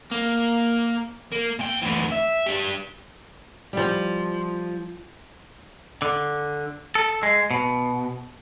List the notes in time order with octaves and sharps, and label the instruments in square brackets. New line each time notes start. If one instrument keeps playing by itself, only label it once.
[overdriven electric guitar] A#3
A#3
A#2 G5
D2 E3
E5
D4 G4
[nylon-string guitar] F3 G3
[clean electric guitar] D3
A4
G#3
B2